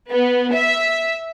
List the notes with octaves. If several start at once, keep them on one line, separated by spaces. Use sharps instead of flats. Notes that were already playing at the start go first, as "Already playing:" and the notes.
B3
E5